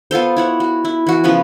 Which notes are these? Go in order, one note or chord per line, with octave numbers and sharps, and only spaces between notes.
B3 F4 A4 C5
E4 C#5 F#5
F#4
E4
E3 F#4
C#3 F3 B3 B4